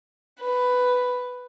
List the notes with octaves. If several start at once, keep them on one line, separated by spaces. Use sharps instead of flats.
B4